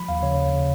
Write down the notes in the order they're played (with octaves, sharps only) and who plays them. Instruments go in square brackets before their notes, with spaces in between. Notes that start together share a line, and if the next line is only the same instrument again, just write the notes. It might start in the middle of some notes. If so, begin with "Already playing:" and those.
Already playing: [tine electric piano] F3 B5
D#2 F5
C#3 C#5
D#2
C#3